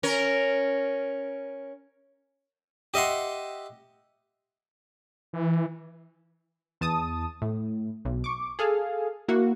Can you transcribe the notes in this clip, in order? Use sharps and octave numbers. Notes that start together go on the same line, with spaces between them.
C#4 A#4
G4 D#5 E5 F#5 C6
E3
E2 A5 D#6
A2
B1
C#6 D6
G#4 A4 F5
A#3 E4 F#4